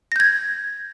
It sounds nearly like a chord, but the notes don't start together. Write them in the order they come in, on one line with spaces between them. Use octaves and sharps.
A#6 G6 G#6